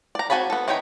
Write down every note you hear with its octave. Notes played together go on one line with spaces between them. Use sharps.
D5 A#5
C4 F#4 G#5 A5 B5
B3 A4
E3 D#4 C#5 G5 B5